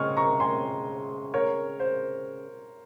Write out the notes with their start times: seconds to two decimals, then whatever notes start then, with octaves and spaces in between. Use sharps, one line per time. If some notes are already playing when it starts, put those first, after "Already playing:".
Already playing: C#3 G#3 C4 C#6 F6
0.17 A#5 C#6
0.40 G#5 C6
1.34 A#4 C#5
1.80 C5